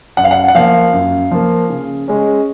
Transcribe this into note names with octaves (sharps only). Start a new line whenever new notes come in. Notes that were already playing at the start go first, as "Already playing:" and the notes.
F#2 F#5
F5
F#5
F#5
F3 A#3 F5
F#2
F3 A#3
C#3
G#3 C#4